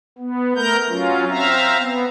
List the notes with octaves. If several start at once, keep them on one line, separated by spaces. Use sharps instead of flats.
B3
A3 A#4 A#5 G6
F#3 C#4 F4
C4 E5 F5 A#5
B3